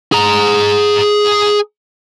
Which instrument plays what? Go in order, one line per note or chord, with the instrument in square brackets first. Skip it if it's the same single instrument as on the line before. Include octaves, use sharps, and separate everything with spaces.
[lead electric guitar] G#4 A#5